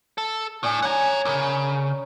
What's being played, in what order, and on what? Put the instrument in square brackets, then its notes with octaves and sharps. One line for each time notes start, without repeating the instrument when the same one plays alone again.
[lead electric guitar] A4
[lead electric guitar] A2 [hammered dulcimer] D4 G#4 G#5
[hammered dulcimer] C#5 G#5 [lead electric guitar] F#5 A#5
[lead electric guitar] C#2 C#3 [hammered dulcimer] A#4